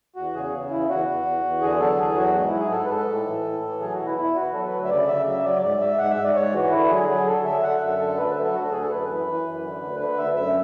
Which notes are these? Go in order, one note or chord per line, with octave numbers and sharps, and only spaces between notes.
E2 F#4
C#3 G#4
C#3
E2 E4
E2 F#4
E2
E2
E2
D3 G#4
F#3 A4
E2 G#4
F#3 F#4
G#2
E4
F#3
G#4
G#2 A4
B4
G#2 A4
A2
E3
A2
E3
F#3 G#4
F#4
B2
E4
E2 E4
E2 F#4
F#3 A4
B4
D2
E5
C#3 D5
C#3 E5
F#3 E5
F#3 D5
G#2 D5
G#2 E5
G#2 F#5
E5
G#2
D5
G#2 C#5
E3 F#4
D3 E4
F#3 G#4
F#3 G#4
D3 A4
D3 E5
D3 F#5
F#2 E5
D3 A4
D2 B4
E5
F#3
A4
D2 F#4
A4
D2 G#4
A4
F#2 B4
E3 B4
E3
F#2
D3
D2
D3 B4
D2 E5
F#2 E5